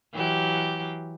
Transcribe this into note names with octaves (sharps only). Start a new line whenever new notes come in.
E3 F#3 G4